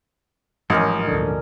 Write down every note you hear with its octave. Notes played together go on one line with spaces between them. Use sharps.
A1 G#2 F3 F#3 C#4 A#4 D#5
D2 A#2 D3